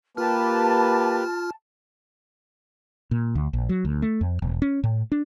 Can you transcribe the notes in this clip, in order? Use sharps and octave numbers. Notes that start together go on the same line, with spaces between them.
A#3 F4 G4 B4 A5 F6
A#2
D2
A#1
F#3
D2
A3
F2
E1
C#4
A2
D4